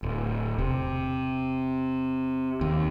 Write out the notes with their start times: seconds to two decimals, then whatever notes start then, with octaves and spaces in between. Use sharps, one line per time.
0.03 D1
0.58 E1 C3
2.61 D#2